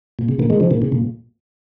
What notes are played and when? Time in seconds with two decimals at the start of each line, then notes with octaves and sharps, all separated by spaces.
0.19 A#2
0.29 C#3
0.39 A#2 D#3
0.50 D#3 G#3
0.60 C#3 F3
0.71 A#2 D#3
0.82 C#3
0.92 A#2